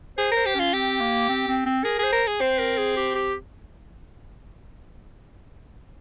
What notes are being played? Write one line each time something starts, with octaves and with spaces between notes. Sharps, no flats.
G#4 C5
A#4 C5
G4
C#4 F4
C4 G4
A#3
C4
C4
C4
G#4 A#4
G#4 C5
A#4
G#4
C4 C5
A#4
G#4
G4
G4